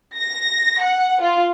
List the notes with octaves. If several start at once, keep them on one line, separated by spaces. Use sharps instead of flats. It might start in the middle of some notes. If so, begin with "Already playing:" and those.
A#6
F#5
F4